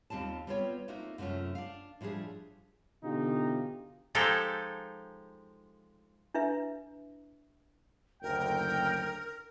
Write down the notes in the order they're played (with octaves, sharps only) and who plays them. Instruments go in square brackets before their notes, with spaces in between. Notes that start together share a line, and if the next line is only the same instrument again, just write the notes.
[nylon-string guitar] D#2 G3 C4 F4 A5
G3 B3 C4 F4 C#5 G5
A3 A#3 C4 D#4 F4 F#4
F#2 C3 A3 C#4 F4
D4 F5
A2 F3 G3 D4 G#4
[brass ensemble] B2 D3 E3 D#4 F4 G4
[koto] F3 G#3 D#4 G4 A4
[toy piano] D4 E4 B4 E5
[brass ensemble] F#1 D2 G5 [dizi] A#4